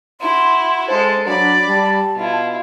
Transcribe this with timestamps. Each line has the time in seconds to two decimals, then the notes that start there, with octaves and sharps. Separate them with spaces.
0.21 E4 F#4 C6
0.89 G#3 A4 C5
1.27 F#3 D4 D5 B5
1.68 G3 A5
2.16 B2 E4 F4